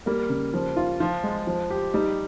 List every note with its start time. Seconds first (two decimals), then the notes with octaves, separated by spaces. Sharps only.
0.06 G3 A#3
0.30 C#3
0.54 F3
0.77 F4
1.00 F3 F4
1.23 G#3
1.47 F3
1.70 G4
1.94 G3 D#4